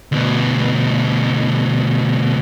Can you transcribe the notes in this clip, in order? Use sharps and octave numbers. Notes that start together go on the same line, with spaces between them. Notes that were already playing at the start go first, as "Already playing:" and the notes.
D2 B2